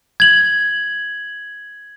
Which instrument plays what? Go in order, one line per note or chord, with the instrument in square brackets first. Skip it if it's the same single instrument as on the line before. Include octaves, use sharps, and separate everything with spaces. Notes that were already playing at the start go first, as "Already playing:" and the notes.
[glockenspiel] G#6 F#7